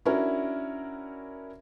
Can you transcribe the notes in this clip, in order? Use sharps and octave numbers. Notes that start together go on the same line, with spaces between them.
C#4 D4 E4 F#4 A#4